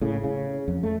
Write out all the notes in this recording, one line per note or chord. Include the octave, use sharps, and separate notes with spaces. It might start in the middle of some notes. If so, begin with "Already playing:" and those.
A2 C#3
C#3
F2
A3